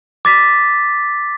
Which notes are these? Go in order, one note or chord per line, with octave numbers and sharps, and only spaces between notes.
D6 A6 B6